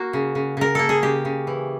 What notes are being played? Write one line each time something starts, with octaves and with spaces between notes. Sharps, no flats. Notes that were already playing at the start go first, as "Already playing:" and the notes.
Already playing: A#3 F#4
C#3
C#3
C#3 A#4
A#3 A4
G#4
C#3 G4
C#3
E3